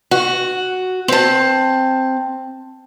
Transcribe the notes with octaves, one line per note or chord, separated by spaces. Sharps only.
F#4
C4 A5